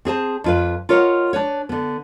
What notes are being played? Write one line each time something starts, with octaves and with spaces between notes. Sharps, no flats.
C4 G#4 C5 A5
F2 F4 B4
F4 A#4 C#5 D#5 F5 F#5
D4 B4 C#5
D3 B3